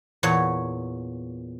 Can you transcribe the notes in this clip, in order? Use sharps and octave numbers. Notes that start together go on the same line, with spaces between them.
E2 A#2 C#5